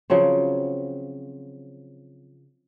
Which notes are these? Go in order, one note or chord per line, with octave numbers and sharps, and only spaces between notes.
C#3 F3 F#3 C4